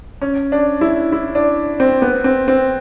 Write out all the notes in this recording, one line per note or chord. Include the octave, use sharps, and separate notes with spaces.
C#4
D4
E4
E4
D4
C4
B3
C4
C4